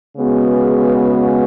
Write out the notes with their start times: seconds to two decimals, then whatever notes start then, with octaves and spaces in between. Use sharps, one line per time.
0.17 C#3 G#3 B3 F#4